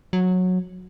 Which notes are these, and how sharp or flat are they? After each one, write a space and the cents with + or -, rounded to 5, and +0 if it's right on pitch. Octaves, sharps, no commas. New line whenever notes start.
F#3 -15